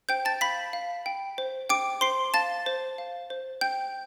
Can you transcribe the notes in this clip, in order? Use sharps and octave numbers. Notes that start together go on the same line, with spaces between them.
C5 G5 G6
A5 A6
F5 B5 B6
F5
G5
C5
G5 D6 D7
C5 C6 C7
F5 A5 A6
C5
F5
C5
G5 G6